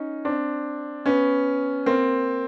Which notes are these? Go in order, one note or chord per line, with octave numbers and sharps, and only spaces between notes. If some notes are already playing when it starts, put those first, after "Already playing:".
Already playing: C#4 D#4
C4 D4
B3 C#4
A#3 C4